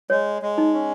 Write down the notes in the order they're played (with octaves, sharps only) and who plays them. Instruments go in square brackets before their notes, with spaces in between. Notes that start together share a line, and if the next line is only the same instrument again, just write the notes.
[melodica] G#3 [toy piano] C#5
[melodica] G#3
[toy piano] D#4
[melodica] C#4